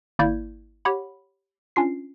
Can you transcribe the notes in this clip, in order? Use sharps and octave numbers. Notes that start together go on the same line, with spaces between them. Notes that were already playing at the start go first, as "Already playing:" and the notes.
G#1 A#3 E4 D5 G6 G#6
G4 C#5 F#5 B5
C#4 D4 F4 C7